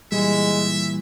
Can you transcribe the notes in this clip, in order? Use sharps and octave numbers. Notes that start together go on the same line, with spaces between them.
A#2 E3 G3 G#3 E5